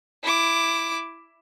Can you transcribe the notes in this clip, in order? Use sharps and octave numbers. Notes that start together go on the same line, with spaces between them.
E4 D6